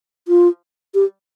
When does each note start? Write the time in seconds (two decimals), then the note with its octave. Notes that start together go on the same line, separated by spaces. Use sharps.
0.28 F4
0.94 G4